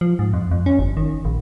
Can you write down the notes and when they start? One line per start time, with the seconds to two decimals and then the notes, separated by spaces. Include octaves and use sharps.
0.01 F3
0.19 G#2
0.33 F2
0.51 F2
0.66 C#4
0.79 G1
0.97 D#3
1.25 A#1